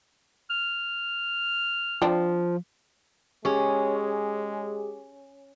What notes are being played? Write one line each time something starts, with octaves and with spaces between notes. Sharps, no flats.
F6
F3 C4 D4
G#3 C#4 G4 G#4